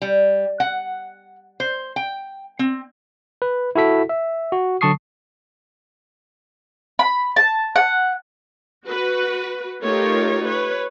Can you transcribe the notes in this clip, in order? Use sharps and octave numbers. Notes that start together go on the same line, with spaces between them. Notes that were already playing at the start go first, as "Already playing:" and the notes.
G3
F#5
C5
G5
C4
B4
E4 F#4 A4 B6
E5
F#4
D3 F#3 A5 C#6 D#6 C7
B5
A5
F#5
F#4 B4
A3 D#4 F4 G4 A#4 C#5
B4 C#5